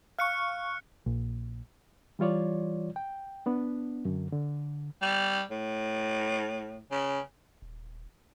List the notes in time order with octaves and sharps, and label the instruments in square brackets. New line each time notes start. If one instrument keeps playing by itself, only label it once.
[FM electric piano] F5 C#6 [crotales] F6 F#6 C#7
[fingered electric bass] A#1
[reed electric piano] E3 G3 F4 C#5 D5
G5
B3 D4
F#2 D3
D3
[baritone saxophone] G3
A2
C#3
[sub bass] D#1